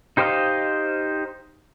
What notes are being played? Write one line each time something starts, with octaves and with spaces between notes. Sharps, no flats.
D#4 G4 C5 D#5 F5